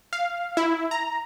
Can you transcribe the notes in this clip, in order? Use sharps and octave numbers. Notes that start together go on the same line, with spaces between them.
F5
E4
A#5